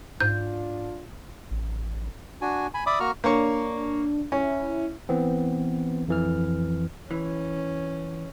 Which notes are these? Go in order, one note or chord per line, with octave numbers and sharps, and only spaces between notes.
G#2 D4 F4 G6
A1
D4 F#4 G#5
G#5 B5
D5 E5 B5 D6 D#6
A#3 F#4 A#5 C#6 F6
A#3 D4 C#5 C#6
C#4 E4
E3 B3 C4
F2 E3 F6
E3 C#4